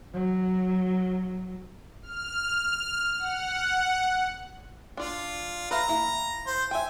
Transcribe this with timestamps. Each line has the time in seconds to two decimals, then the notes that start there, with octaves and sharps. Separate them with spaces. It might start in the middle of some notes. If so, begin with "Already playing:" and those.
0.13 F#3
2.02 F6
3.18 F#5
4.97 D4 F4 D5
5.71 B4 E5 F5 A#5
5.88 A#3 E4
6.47 C5
6.71 E5 G5 G#5